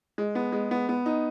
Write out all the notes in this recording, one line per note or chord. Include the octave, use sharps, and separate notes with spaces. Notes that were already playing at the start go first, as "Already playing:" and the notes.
G#3
B3
G#3
B3
B3
D#4